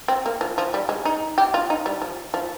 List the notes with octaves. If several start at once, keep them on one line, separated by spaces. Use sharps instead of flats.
C4
A#3
F3
F3
G3
G#3
D#4
G4
F4
D#4
G3
F3
F3